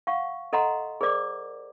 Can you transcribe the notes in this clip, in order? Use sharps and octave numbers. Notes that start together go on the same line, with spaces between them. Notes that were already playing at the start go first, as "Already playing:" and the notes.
F5 F#5 C#6
A4 D#5 F#5 A#5 C6
G#4 A#4 C5 D5 D6